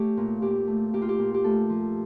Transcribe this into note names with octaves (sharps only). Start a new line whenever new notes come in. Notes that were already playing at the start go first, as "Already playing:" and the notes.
Already playing: A3 G4 C#5
A#2
A#2 G4
A3
A#2 G4
F4
G4
A#2
G4
A3 A4
F3